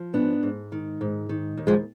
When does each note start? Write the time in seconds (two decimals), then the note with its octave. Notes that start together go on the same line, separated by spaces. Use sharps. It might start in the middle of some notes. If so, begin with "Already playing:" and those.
Already playing: F3
0.14 G#2 B3 D4
0.43 G#2
0.72 D#3
1.01 G#2
1.29 D#3
1.57 D#2
1.67 F3 G#3